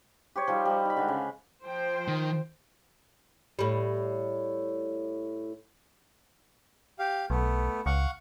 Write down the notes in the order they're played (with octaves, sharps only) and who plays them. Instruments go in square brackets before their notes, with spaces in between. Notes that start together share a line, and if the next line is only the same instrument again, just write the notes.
[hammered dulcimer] G4 C5 C#5
F3 G3 D#4 C6
G3 A#5
D#4 B5
D3 G#3
C#3
[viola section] F3 C5 G5
[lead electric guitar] D#3
[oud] A2 G3
[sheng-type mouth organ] G4 F5
[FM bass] B1 [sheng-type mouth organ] A3 B3
[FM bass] C#2 [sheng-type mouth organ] F5 F#5 C#6